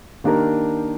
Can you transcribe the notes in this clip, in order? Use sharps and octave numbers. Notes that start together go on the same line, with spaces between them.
D#3 A#3 D4 G4 A#4